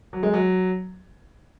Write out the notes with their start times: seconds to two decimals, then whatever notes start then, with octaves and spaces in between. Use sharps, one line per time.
0.13 F#3
0.23 G#3
0.33 F#3